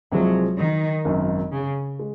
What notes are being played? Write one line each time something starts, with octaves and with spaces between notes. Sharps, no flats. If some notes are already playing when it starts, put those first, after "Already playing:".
C2 C3 F3 F#3 G#3
D#3
G#1 F#2 D#3
C#3
G#3